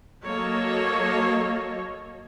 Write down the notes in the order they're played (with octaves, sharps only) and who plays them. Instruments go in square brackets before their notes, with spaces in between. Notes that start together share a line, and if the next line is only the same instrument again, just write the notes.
[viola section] F#3 A#3 A4 C#5 D#5